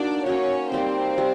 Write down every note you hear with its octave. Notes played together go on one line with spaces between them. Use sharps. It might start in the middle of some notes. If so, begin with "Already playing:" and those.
Already playing: A#3 D4 D#4 F#4 D5
A#3 C#4 D#4 F#4 C#5
G3 A#3 C4 D#4 C5
G3